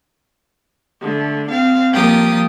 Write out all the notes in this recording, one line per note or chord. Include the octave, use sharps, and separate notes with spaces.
D3 A3
C4 F5
F3 G3 A#3 G4 D#6